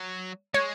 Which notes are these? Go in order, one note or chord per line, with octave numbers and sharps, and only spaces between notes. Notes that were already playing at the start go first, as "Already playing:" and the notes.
Already playing: F#3
G#3 C#5